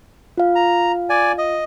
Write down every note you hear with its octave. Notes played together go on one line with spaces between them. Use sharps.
F4 F5
A#5
D5 G#5
D#5